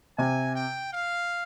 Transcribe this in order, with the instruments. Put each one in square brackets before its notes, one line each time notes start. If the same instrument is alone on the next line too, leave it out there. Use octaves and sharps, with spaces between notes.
[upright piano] C3 [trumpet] G#5
[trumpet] G5
F5